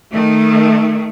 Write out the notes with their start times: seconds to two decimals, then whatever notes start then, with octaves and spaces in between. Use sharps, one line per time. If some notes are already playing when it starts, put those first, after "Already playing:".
0.15 D#3 A3